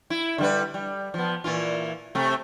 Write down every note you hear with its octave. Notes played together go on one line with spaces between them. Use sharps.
E4
D3 G3 B4
G3
F3 B3
A#2 E3 F4
C3 A3